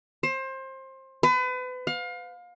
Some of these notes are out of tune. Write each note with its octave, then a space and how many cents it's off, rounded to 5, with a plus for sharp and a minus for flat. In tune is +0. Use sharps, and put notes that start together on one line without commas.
C5 +25
B4 +35
F5 +30